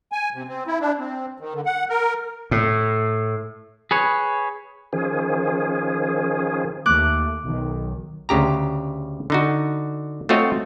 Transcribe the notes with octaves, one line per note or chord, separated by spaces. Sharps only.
G#5
C3
C4
E4
D4
C4
D#3
D3
F#5
A#4
A2
G#4 B4 C#5
D#3 F3 C#4 G#4
D#2 A3 D6 F#6
B1 D#3
D2 C#3 G4 A#5
D3 D#4 F#4
A3 C4 F4 F#4 C#5 D#5